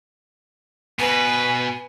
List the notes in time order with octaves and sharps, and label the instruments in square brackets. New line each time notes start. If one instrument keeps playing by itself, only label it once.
[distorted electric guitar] B2 [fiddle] B4 [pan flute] G#5